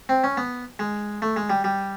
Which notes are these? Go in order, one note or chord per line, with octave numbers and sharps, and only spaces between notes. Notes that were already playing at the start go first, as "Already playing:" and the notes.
C4
C#4
B3
G#3
A3
G#3
G3
G3